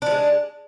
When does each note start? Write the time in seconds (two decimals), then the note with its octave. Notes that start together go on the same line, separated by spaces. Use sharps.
0.02 D4
0.06 F3
0.11 G#3